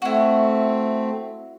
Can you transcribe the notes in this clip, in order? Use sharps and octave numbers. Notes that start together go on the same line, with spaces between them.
A3 C4 E4 F#4